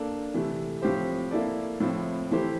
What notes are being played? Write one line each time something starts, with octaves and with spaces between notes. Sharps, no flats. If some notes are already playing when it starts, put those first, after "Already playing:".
Already playing: A#3 D4 A4
C3 E3 A3
A2 F3 C4 G4 C5
A#3 E4 A4 D5
A2 F3 C4 E4
E3 A3 E4 G4 C5